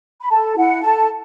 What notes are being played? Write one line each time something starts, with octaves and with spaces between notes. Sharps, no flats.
B5
A4 A5
E4 F#5
A4 A5